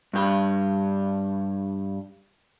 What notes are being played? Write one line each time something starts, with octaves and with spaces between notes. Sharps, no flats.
G2 G4